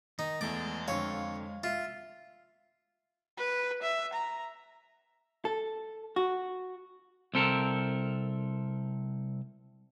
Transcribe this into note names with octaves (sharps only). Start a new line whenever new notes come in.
D#3 D#4
E2 G#3 A3 D#5 D6 A6
F2 D3 C#5 F5
F4 E5
B4
E5
A#5
A4
F#4
C2 C4 A4 A#4